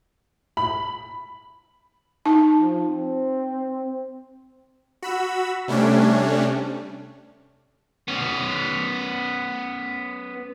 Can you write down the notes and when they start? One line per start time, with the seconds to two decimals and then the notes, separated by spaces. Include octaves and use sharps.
0.57 B5
2.26 D#4 A5
2.59 F3
2.88 C4
5.02 F#4 B5 E6
5.68 C3 G3 A3 C#4 D4
8.08 B3 C#4